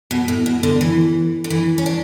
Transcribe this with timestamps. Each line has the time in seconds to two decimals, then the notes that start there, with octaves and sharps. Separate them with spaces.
0.11 B2
0.28 A2
0.46 B2
0.63 D3
0.81 E3
1.44 D3
1.50 E3
1.78 C#4
1.86 D4